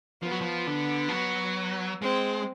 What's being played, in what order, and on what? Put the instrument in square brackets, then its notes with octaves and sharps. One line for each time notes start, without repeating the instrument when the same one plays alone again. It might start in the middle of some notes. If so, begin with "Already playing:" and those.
[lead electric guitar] F3 [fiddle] B3
[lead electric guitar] F#3
F3
D3
F3
F#3
[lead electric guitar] G#3 [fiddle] C4